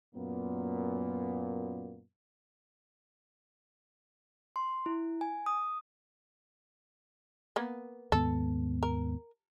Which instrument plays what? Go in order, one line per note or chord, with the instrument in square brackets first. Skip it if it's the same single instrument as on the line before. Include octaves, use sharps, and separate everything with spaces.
[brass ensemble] F#2 A#2 A#3 B3
[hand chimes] C6
E4
G#5
D#6
[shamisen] A#3 B3
[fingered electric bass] D#2 G#2 B3 [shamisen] A4
[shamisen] A#4